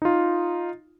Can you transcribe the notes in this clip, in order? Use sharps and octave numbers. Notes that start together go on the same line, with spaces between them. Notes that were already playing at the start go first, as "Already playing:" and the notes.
D#4 F4